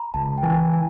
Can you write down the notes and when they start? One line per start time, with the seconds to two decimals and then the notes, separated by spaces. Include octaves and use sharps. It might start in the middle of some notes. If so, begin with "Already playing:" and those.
Already playing: A#5 B5
0.14 C#2 A5
0.38 G5
0.43 E3 G#5
0.73 G#5